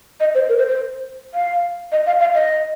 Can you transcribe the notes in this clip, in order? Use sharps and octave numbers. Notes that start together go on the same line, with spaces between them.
D#5
C5
A#4
C5
C5
F5
D#5
F5
F5
D#5